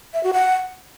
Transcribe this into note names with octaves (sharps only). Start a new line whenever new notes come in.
E5
F#4
F#5